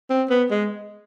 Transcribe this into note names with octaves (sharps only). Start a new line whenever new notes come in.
C4
B3
G#3